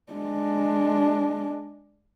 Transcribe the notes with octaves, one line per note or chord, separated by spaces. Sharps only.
G#3 D4